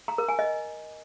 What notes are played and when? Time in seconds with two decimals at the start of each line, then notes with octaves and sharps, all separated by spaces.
0.08 A#5
0.18 A#4
0.29 G#5
0.39 D#5